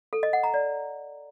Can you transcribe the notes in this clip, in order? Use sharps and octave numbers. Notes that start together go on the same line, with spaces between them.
A4
D#5
F#5
A#5
D5